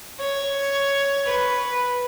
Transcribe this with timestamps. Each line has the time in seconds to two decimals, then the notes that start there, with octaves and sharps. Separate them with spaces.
0.20 C#5
1.26 B4